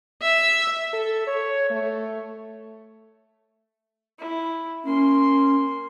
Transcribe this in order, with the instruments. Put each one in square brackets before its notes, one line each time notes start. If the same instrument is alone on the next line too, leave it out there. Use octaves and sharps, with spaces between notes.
[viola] E5
[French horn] A4
C#5
A3
[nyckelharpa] E4
[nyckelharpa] A#3 C6 [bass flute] C#4